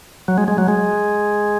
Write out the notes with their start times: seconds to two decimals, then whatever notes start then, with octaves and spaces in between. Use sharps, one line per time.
0.28 F#3
0.38 G#3
0.48 G#3
0.58 F#3
0.68 G#3